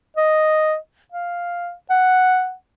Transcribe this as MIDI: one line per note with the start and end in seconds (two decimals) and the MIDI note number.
0.17 0.76 75
1.12 1.72 77
1.90 2.53 78